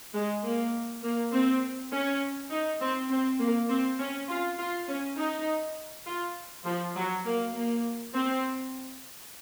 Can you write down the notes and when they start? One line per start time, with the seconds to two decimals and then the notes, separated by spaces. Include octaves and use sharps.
0.14 G#3
0.44 A#3
1.03 A#3
1.33 C4
1.93 C#4
2.52 D#4
2.81 C4
3.11 C4
3.39 A#3
3.70 C4
4.00 C#4
4.29 F4
4.58 F4
4.88 C#4
5.18 D#4
6.07 F4
6.65 F3
6.96 F#3
7.24 A#3
7.54 A#3
8.14 C4